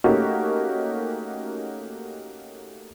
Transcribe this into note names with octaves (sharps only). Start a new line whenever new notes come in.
A3 A#3 C#4 D#4 F#4 G4